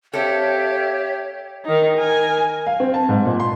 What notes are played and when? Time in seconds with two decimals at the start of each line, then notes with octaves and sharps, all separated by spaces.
0.13 C4 G4 A4 C#5 E5 F5 G5
1.65 D#3 D#4
1.97 A#4 G#5
2.67 F5
2.80 C4
2.94 A5
3.09 G#2
3.25 A#2
3.40 C6